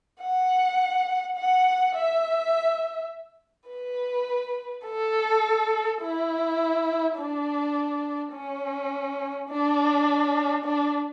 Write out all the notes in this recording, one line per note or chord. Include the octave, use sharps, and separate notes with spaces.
F#5
F#5
E5
B4
A4
E4
D4
C#4
D4
D4